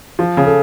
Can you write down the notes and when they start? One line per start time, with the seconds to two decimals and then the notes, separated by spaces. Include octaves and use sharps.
0.19 F3
0.37 C#3
0.46 A4